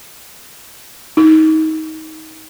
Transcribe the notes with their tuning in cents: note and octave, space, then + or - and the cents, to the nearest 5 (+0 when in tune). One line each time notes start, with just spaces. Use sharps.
D#4 +25